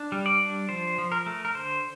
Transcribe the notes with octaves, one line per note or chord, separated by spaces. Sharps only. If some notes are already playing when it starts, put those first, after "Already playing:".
Already playing: D4
G3
D5
D4
F3 C5
F3
A#4
A3
A#4
D3 C5